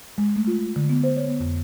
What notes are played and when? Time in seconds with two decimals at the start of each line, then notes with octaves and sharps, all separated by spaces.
0.18 G#3
0.36 A3
0.47 F4
0.64 F4
0.76 D3
0.90 B3
1.04 C5
1.17 C#5
1.28 B3
1.40 F2